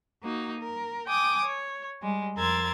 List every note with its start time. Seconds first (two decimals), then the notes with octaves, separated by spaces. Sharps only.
0.23 A#3 D#4 F#4
0.60 A#4
1.06 G5 G#5 D6 D#6
1.44 C#5
2.01 G3 G#3
2.36 F2 A#4 C6 E6 G#6 A6